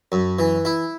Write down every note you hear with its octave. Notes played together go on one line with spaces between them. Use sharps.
F#2
E3
E4